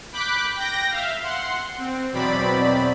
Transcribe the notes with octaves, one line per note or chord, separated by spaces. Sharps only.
B5 D6 F#6 G6 B6
G5 G6 A#6
E5 F5
F#5 C6
C4
E2 B2 F#3 C4 D5 B5